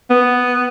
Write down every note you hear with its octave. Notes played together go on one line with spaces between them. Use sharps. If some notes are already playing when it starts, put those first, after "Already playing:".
B3